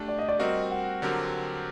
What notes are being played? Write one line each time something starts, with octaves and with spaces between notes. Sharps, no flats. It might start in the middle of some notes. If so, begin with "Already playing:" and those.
Already playing: A3 D4 G4
D5
D#5
D5
G3 C4 F#4 A#4 D#5
F#5
D3 F#3 C4 G4 A#4